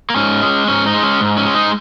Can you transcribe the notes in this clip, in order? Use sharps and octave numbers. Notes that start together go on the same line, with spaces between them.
A#3
G#2 C#4
G#3
G#2 C#4
D#4
G#3
C#4
G#2
C#4
G#3
D#4